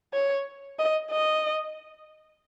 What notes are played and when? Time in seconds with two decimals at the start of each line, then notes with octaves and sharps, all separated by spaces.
0.13 C#5
0.79 D#5
1.11 D#5